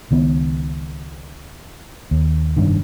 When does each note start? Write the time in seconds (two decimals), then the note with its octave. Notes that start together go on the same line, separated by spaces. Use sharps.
0.11 C#2 D#3 B3
2.11 D#2
2.57 F1 G2 D#3